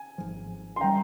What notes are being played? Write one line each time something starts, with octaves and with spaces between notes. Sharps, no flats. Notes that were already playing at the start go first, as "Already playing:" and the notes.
Already playing: G#5
G#1 G#2 F3
C6
C3 G3 G5 A#5